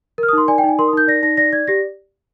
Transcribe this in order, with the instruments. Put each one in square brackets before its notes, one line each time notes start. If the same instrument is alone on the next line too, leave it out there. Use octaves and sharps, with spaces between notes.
[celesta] A#4 F6
D#6
D#4 C6
D5 G#5
G5
D#4 G#5
A#4 C6
D#6
D#4 G6
D5 A#6
D#4 A#6
D5 A#6
D5 G#6
G4 A#6